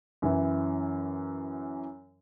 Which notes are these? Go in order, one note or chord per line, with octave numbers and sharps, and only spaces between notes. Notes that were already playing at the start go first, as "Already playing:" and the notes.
F#2 E3 E4